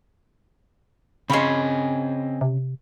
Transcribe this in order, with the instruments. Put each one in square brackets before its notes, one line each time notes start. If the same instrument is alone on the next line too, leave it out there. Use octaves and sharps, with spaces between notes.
[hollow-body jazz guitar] C#3 C#4 C6 [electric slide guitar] C4 D#5 [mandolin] G#4 B5
[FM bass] C3